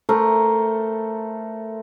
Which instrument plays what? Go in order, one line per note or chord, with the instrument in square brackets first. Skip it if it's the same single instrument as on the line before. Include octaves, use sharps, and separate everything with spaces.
[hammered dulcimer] A3 A#4 C5